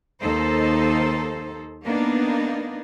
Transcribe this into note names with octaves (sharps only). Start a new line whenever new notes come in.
D#2 D#4 A4 C5
A#3 B3 D4 D#4